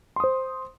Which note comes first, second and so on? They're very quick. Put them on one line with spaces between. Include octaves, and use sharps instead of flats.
C6 D#6 C5